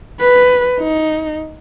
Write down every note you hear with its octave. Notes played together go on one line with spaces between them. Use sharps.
B4
D#4